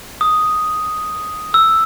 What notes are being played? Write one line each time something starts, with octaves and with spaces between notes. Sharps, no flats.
D#6
E6